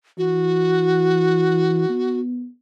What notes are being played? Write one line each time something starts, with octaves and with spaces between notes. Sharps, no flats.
E3 F#4
B3